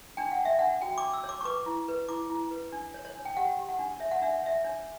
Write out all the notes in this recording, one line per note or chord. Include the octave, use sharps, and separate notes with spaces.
D4 G5
F#5
D4
E5
D4 F#5
F#4 G5
D6
D4
E6
C#5
D6
C#6
B4 D6
E4
B4
E4 D6
E4
B4
D4
C#5
C#5
D4
G5
G4 F#5
G4
F#5
D4
C#5 E5
F#5
D4 E5
F#5
C#5 E5
D4 C#5